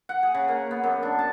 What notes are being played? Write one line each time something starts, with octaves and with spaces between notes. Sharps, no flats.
F#5
G#4
C#3
A#3
B3
F#2
D4
A5